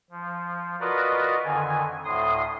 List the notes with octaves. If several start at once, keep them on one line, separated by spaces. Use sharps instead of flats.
F3
F4 F#4 A#4 B4 D5 D#5
F2 D3 D#3 G#5
D2 A2 C6 D#6